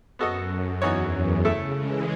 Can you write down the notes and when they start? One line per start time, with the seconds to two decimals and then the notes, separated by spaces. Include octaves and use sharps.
0.19 F#2 B3 F#4 A4 D#5
0.82 E2 E3 B3 D#4 F#4 C#5
1.13 F#2
1.45 C#3 A3 E4 A4
1.76 E3 G#3